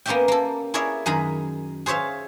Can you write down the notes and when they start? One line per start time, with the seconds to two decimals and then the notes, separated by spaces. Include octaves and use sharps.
0.06 A#3 B3 C#4 G4 E5 G5
0.28 A#3 A4
0.74 E4 G#4 A#4 C#5 D5 E5
1.06 F#2 D#3 G#4 A#5 B5
1.86 G#4 C5 C#5 E5 F5